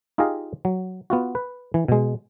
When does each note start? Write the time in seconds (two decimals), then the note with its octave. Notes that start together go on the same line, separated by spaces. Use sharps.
0.18 D#4 F4 G4 G#4 D#5 F5
0.65 F#3
1.10 B3 F4 F#4
1.35 B4
1.74 E3
1.88 B2 G#3